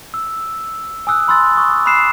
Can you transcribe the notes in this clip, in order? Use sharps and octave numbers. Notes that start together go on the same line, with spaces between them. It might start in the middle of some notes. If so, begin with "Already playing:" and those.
E6
G#5 D#6 E6 F#6
B5 C6 E6 F#6 A6
C#6 D#6
B5 D#6 F#6 C7 E7